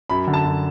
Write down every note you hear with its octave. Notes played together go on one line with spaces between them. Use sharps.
F#2 B5
D3
A5
F#2